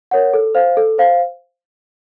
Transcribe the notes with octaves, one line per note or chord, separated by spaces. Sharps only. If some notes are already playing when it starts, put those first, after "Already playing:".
A#4 C#5 F#5
A4
C5 F5
A4
C5 F5